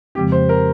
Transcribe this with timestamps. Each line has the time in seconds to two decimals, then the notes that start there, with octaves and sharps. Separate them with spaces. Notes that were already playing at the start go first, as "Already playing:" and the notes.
0.15 F2 C#3 F3 G#3 C4 G4
0.32 C5
0.49 A#4